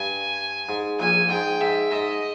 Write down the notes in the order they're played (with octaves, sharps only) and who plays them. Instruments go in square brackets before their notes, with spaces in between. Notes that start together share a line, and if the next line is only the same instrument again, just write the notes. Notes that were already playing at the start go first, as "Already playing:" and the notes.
Already playing: [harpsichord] G2 [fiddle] G#5
[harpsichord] G#2
[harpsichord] A#1 A#2 [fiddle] G#5
[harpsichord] G#2 [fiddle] G5
[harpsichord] G#2 [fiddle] E5
[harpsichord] G#2 [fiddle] D#5